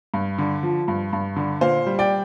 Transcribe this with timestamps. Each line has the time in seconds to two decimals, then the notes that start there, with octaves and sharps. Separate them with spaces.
0.14 G2
0.38 D3
0.63 F3
0.88 G2
1.13 G2
1.36 D3
1.61 A#2 C5 F5
1.86 G3
1.99 D5 G5